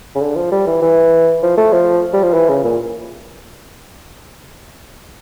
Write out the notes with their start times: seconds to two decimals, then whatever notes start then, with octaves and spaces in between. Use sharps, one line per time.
0.15 C#3
0.21 D3
0.36 F3
0.52 G3
0.67 E3
0.82 E3
1.43 F3
1.58 A3
1.73 F3
2.14 G3
2.23 F3
2.34 E3
2.49 C#3
2.64 A#2